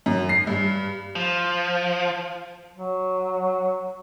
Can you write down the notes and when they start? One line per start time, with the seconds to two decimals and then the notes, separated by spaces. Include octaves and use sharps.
0.06 F#2
0.29 C7
0.47 G2
1.16 F3
2.76 F#3